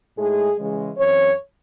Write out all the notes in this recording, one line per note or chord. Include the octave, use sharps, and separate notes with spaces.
A2 G#3 D#4 G#4
C#3 E3 G#3
F#2 E3 C4 C#5